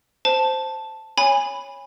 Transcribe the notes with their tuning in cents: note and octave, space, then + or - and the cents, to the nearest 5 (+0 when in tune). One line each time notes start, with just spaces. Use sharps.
C5 -5 A5 +0
C#5 +0 G#5 -20 B5 +0